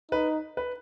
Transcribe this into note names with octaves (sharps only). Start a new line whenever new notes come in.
D#4 B4
B4